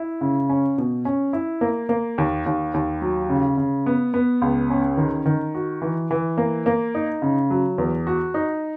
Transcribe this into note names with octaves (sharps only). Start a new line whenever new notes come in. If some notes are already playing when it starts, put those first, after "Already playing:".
Already playing: E4
C#3
C#4
B2
C#4
E4
A#3
A#3
D#2
D#2
D#2
F#3
C#3
C#3
B3
B3
C#2
C#4
D#3
D#3
F#4
E3
E3
A#3
A#3
D#4
C#3
F#3
E2
F#4
D#4